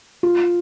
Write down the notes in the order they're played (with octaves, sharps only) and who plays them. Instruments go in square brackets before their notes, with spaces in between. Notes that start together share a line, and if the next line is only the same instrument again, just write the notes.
[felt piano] F4